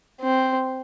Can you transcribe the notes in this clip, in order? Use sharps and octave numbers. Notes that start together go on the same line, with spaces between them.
C4